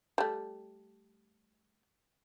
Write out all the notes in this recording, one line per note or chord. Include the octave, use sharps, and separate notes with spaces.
G3 A3